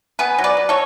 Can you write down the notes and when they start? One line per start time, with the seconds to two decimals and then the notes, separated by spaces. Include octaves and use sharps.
0.19 B3 G#4 B4
0.38 F#3
0.44 B4 D5
0.57 F#3
0.69 A4 C#5